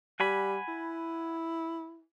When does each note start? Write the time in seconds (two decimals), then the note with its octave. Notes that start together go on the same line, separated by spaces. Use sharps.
0.20 G3 F#5 G#5 B5
0.68 E4